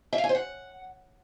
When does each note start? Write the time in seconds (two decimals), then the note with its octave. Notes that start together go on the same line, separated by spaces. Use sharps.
0.13 E5
0.18 F5
0.24 G#5
0.29 C5
0.35 F#5